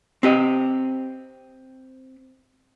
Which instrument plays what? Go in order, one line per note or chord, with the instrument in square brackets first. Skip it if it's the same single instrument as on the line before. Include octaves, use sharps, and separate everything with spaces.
[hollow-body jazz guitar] C4 G4 D#5